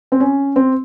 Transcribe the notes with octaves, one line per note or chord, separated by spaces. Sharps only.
C4
C#4
C4